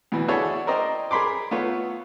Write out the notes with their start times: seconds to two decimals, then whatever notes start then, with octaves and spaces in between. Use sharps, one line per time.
0.12 D2 B2 E3
0.28 D4 E4 F#4 G#4 A4 C#5
0.67 A#4 C5 D5 D#5 G5 A#5
1.11 G#4 A#4 B5 C6 D6
1.51 A3 B3 F4 B4 C#5